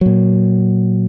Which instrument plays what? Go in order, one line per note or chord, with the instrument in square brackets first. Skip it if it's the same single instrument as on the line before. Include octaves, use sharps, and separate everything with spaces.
[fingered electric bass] A#2 F#3